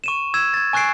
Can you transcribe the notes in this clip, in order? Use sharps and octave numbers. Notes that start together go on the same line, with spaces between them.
C#6 D#7 E7
E6 G#6 E7
G#6 A6
G#5 C#6 F#6 A6 C7 D7